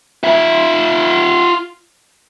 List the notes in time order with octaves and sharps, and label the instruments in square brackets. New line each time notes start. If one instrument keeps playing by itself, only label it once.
[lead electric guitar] F4 E5